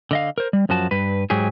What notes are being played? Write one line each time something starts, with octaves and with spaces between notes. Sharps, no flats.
D3 D#5 F5
A#4 C5
G3
F#2 F3 F#4 A5
G2 B4
G#2 F#3 G4 G#4